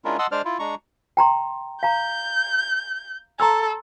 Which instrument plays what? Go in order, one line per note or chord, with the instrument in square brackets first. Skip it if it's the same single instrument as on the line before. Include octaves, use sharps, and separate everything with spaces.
[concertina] G#3 C#4 D4 E4 F4 A#4
D#5 F#5 A5 C6 D#6 E6
G#3 D4 C5 D5 F6
E4 F4
G#3 D4 A#5 C#6
[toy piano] G5 A#5 C6
[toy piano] F5 A#5 [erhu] G6
[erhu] A4 [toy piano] A#5 C6 E6